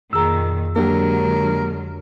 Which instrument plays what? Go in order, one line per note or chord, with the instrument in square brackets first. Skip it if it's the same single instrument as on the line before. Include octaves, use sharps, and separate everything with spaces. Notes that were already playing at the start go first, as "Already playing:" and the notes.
[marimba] F2 G#4 A#5 [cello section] A#2 D#3 [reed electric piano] E6
[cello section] D3 F#3 G#3 [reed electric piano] A#3 D4 G4 [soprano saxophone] A#4